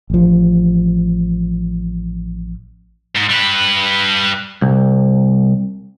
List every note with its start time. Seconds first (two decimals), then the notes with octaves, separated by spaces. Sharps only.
0.10 A1 F3
3.16 G#2
3.30 G3 B4
4.62 C2